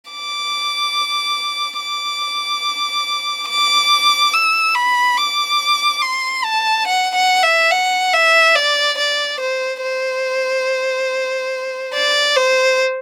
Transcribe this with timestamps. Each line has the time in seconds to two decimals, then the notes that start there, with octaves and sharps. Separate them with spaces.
0.11 D6
1.80 D6
3.49 D6
4.34 E6
4.76 B5
5.18 D6
6.02 C6
6.44 A5
6.87 F#5
7.15 F#5
7.43 E5
7.71 F#5
8.14 E5
8.56 D5
8.98 D5
9.40 C5
9.83 C5
11.94 D5
12.36 C5